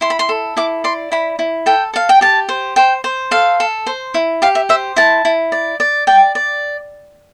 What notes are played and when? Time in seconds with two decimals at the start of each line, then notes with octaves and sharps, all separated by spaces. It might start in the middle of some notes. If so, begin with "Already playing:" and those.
0.01 E4 C6
0.10 B5
0.19 C6
0.29 A4
0.57 E4 D6
0.84 D5 C6
1.12 E4 B5
1.39 E4
1.66 A4 G5
1.94 A4 F5
2.09 G5
2.21 G4 A5
2.49 C5
2.76 C5 G5
3.04 C5
3.31 A4 F5
3.60 A4
3.87 C5
4.14 E4
4.42 G4 F5
4.55 E5
4.69 C5 E5
4.96 E4 A5
5.25 E4
5.52 D5
5.80 D5
6.07 D5 G5
6.35 D5